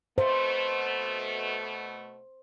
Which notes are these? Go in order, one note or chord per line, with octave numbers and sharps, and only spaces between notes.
B2 A3 C5